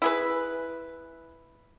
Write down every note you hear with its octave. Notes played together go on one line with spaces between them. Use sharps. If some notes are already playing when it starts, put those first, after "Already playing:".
E4 G#4 B4